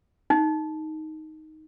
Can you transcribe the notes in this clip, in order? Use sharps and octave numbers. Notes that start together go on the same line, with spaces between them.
D#4